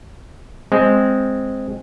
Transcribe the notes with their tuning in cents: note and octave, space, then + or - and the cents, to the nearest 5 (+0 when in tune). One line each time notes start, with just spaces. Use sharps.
G#3 +0 C4 +0